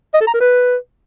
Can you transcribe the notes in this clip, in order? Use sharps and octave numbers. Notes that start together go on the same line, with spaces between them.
D#5
A4
A#5
A#4
B4